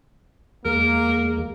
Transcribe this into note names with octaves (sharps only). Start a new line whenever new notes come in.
E2 G#3 A#3 A#4